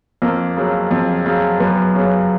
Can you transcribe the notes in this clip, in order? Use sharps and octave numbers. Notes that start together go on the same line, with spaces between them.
F2 A#3
C#3 F#3
F2
C#3 F#3
F#2 B3
C#3 F#3